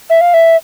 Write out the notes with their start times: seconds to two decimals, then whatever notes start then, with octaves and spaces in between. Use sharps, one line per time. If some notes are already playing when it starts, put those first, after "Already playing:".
0.10 E5
0.21 F5
0.34 E5